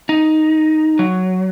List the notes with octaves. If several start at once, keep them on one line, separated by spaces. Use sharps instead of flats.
D#4
F#3